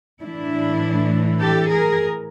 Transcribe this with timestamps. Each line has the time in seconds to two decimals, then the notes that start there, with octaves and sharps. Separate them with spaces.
0.22 A2 E3 D4 E4
1.40 G4 A4
1.70 G#4 A#4